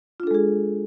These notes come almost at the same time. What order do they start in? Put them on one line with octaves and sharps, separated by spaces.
F4 D4 A4 G#3 G#4